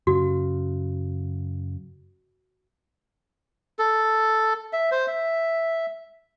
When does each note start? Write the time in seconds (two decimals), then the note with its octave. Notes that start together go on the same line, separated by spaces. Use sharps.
0.07 F#2 C#3 F#4
3.79 A4
4.73 E5
4.92 C5
5.07 E5